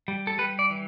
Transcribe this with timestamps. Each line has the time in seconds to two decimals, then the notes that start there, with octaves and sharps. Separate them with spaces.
0.08 G3
0.27 A4
0.38 G3 B4
0.59 D5
0.70 E3